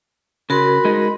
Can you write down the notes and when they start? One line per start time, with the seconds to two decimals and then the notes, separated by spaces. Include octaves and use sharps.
0.50 C#3 F#4 A#4 B5 C6
0.85 G#3 D#4